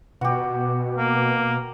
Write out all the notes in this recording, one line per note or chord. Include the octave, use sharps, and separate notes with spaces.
B2 F#4 G4
A#3